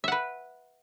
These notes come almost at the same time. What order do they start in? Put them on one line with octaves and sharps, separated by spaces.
E5 F#5 B4